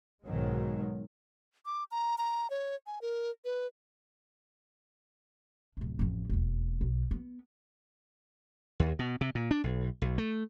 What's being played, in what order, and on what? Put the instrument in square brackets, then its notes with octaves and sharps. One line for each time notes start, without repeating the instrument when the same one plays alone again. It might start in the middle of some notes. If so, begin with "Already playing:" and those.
[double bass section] B1 G#2 B2 D#3 F#3 G#3
[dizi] D6
A#5
A#5
C#5
G#5
A#4
B4
[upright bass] D1 C3
A1 F2
E1 D#2
B1
B3
[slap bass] D#2
B2
C3
A#2
D4
B1
B1
A3